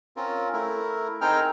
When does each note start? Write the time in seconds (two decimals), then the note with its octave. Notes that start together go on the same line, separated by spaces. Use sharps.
0.17 C4 C#4 F4 A#4
0.53 A3 E4 A#4
1.21 C4 D#4 G#4 A#4 G5 F6